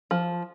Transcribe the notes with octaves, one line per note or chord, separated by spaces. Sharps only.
F3